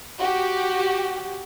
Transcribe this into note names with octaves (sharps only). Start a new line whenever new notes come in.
F#4 G4